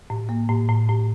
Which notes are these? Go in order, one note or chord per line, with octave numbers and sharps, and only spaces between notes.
A2
A#3
A2
A2
A2